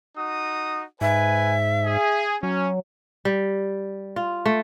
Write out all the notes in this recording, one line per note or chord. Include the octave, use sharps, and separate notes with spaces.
D#4 F#4 D#6
G#2 B4 E5 G#5
G#4
F#3 C#4
G3
F4
A3